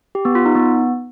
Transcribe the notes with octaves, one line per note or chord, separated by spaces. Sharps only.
G4
B3
F4
D#4
B3